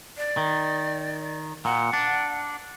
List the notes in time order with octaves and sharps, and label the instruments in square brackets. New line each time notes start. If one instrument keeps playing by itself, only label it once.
[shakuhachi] D5
[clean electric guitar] D#3
[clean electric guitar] A#2 [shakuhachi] F#5
[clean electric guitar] D4